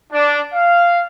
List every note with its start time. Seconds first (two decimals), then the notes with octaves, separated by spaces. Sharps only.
0.12 D4
0.54 F5